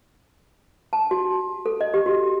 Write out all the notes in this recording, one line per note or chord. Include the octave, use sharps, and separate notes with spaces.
A5
F#4
A4
D#5
G4
F#4